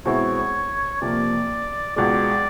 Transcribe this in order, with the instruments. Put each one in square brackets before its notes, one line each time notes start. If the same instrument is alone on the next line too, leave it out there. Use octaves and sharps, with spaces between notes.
[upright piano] B2 G#3 C4 E4 [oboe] C#5
[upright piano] C3 F3 A#3 [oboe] D5
[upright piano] C#2 B2 G#3 [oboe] D5